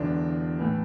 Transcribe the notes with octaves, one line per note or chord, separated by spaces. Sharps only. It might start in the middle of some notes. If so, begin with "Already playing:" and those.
Already playing: E1 E2 D3 F#3 D4
A2 E3